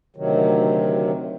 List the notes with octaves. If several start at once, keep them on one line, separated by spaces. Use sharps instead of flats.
D2 C3 D#3 F#3